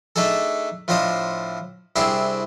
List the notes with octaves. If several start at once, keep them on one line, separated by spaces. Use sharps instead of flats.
A3 D4 D#4 G#4 A4
A2 F3 D4 C5 D#5 D#6
C2 C4 D4 E4 G#4 C6